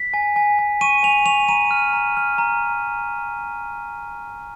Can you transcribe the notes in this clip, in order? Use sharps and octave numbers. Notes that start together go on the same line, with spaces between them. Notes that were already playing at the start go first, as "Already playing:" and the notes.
Already playing: B6
G#5
G#5
G#5
C#6 D#7
G#5 F7
C#6 F7
A#5 D#7
F6
A#5
F6
A#5